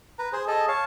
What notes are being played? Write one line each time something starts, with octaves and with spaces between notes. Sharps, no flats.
B4 A#5
G#4 C5
G#4 A4 D#5 A5
C#5 F5 A5